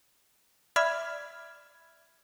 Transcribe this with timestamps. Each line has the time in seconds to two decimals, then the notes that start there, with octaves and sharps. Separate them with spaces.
0.76 D5 E5 B5 F6 G#6